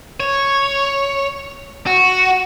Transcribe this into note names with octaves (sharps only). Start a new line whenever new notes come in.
C#5
F#4